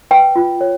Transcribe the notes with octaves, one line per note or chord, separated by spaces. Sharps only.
B4 G5
F4
C#5